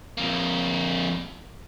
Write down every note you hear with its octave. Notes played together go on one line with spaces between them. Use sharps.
F2 A#3